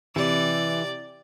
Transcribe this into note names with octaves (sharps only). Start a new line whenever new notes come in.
C3 E3 D5